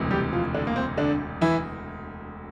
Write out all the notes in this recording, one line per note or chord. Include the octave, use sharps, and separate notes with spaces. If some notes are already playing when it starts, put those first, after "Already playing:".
Already playing: E1 D2 C3 E3
G3 G4
F3 F4
D3 D4
A#3
C4
D3 D4
E3 E4